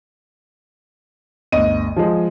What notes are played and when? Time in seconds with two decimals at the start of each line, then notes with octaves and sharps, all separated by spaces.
1.52 G1 D2 D#5 D#7
1.96 F3 G#3